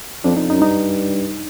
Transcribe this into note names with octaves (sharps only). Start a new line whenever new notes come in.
F2 D4
F2 D#4
F#2 D#4
G2 D#4